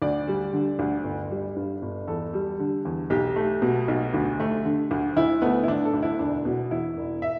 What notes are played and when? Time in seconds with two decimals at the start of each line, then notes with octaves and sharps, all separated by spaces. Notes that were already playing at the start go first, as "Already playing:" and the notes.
0.02 D2 D5
0.27 G3
0.53 D3
0.79 D2
1.04 G1
1.30 G3
1.56 G2
1.82 G1
2.07 E2 A4
2.33 G3
2.59 D3
2.85 E2
3.10 B1 G4
3.36 A3
3.62 B2
3.88 B1
4.14 D2
4.40 A3
4.65 D3
4.91 D2
5.16 D2 E4
5.42 A3 B3
5.63 E4
5.68 D3 D4
5.85 A4
5.94 D2
6.02 E4
6.19 E1 D4
6.45 B2
6.71 E2 E4
6.97 E1
7.22 E5